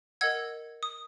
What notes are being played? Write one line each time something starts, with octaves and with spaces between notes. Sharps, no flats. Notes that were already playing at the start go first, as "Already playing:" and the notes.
A#4 D#5 F#5 E6 G#6
D#6